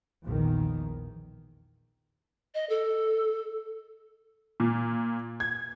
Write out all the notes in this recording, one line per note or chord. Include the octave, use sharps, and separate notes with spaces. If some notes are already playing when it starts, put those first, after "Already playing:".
A#1 E2 D#3
D#5
A4
A#2
G#6